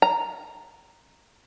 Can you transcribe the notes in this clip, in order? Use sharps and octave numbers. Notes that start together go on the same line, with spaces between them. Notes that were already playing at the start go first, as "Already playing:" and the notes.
A#5